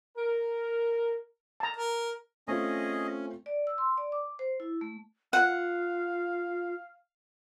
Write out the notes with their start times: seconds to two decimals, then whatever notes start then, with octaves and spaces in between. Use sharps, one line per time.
0.17 A#4
1.60 A5 A#5
1.77 A#4
2.48 A3 C4 C#4 F4 G#4 D#5
3.46 D5
3.67 E6
3.78 C6
3.98 D5
4.12 D6
4.39 C5
4.60 E4
4.81 A3
5.33 F4 F5 F#5